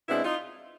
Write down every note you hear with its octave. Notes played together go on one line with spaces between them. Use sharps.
B2 G#3 C4 D4 E4
D#4 F4